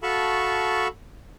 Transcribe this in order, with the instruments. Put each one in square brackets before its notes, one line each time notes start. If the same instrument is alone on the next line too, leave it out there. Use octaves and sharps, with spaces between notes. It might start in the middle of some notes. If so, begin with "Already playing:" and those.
[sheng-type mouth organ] F#4 A4 F5 A5 B5 C#6